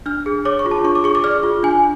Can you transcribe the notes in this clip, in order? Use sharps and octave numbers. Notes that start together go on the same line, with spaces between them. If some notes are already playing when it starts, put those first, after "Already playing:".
D4 F6
G#4
C#5 D6
C#6
F4
A5
D4 C#6
D6
G#4 C#6
D6
D5 F6
F4
D4 G#5